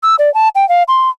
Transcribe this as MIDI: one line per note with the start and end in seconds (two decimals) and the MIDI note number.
0.03 0.15 88
0.19 0.32 74
0.34 0.48 81
0.55 0.68 79
0.69 0.83 77
0.88 1.10 84